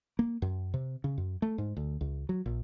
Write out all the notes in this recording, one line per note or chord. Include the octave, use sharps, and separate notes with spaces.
A#3
F#2
C3
C#3
F#2
A3
G#2
D2
C#2
F#3
A#1